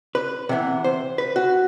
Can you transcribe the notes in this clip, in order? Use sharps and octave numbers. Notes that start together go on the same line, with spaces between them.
B4
C3 E3 B3
C5
B4
F#4